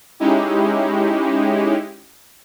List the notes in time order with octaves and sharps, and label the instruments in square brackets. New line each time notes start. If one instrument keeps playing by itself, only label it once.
[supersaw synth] G#3 C#4 D#4 E4 G4